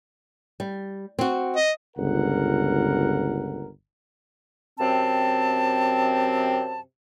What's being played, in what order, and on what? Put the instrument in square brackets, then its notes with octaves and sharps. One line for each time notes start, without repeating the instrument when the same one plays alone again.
[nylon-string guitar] G3
C4 F#4
[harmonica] D#5
[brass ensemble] G1 C#2 A#4 F#5
[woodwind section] F#2 C3 C4 A5